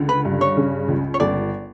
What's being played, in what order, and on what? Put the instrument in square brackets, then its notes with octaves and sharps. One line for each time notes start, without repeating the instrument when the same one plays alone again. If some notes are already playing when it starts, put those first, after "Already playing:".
Already playing: [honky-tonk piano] C#2 D3
[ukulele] B4
[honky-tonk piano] G2
[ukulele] C#5
[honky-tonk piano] C#3
C#2
[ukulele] C#5
[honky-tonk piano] G1 [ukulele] D5